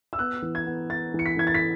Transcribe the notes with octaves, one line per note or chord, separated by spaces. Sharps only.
E6
B3 F#6
E3
G#6
B3
B3 A6
E3 C#7
B6
E3 G#6
A6
B6